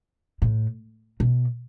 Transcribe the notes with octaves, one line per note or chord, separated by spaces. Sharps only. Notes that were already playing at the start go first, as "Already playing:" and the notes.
A2
B2